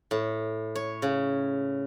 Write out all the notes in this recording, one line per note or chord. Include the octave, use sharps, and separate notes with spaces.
A2
C#5
C#3